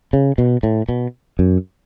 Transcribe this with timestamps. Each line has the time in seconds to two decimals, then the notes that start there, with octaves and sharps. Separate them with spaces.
0.13 C#3
0.38 B2
0.63 A2
0.89 B2
1.39 F#2